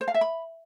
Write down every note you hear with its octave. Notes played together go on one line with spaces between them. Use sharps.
C5
F5
E5
B5